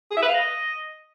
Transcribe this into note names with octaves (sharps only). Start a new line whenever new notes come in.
G#4
E5
B4
F5
D#5